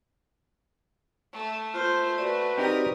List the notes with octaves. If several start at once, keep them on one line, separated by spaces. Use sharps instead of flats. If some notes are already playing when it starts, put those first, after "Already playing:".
A3
F4 C5
F#4 B4 D5
C4 D#4 G4 A#4 D#6